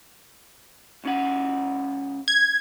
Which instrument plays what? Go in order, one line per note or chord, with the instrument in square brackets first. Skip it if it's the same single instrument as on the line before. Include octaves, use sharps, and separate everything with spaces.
[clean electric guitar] C#2 C#4 F#5
[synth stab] G#6